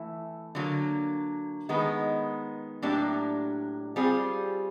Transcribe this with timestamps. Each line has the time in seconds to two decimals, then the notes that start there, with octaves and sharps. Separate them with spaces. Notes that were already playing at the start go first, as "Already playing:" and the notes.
Already playing: E3 A3 E4
0.55 D3 F#3 A#3
1.69 D#3 G#3 B3 D#4
2.82 A2 F#3 A#3 D4 G4
3.96 G3 C4 F4 G#4